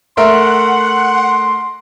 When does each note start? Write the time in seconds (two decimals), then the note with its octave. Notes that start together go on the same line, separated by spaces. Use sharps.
0.17 A3 A#4 E5 F#5 C6